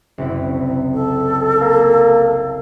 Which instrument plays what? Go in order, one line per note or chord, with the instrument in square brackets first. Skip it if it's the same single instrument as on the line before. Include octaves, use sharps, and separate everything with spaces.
[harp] F#1 C2 E4
[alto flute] A4
[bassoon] A#3